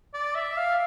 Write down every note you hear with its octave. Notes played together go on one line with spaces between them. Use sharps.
D5
E5
F5